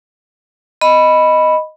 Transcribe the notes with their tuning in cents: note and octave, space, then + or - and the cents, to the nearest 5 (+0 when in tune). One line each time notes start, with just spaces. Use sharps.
D#5 +0 B5 +0